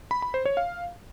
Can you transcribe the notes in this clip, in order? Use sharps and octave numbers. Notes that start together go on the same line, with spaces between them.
B5
B5
C5
C#5
F5